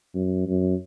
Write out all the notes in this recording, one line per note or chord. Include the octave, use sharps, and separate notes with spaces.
F#2
F#2